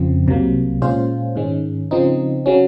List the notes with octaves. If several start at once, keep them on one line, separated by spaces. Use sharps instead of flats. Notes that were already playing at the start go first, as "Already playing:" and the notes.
Already playing: F2 C#3 F3 C4
C2 C3 F#3 A#3
A#2 G#3 C#4 F4 C5
G#2 D#3 G#3 C#4
C#3 F3 C4 D#4
C#3 F#3 C#4